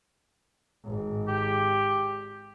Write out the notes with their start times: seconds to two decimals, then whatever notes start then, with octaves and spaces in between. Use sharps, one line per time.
0.85 G#1
1.28 G4